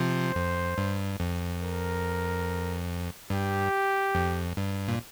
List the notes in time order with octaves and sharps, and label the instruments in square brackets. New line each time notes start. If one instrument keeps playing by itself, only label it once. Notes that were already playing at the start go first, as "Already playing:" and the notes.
Already playing: [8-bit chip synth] C3 F3 [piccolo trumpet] C5
[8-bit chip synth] F2
G2
F2
[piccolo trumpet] A#4
[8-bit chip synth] G2 [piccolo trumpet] G4
[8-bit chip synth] F2
G2
A#2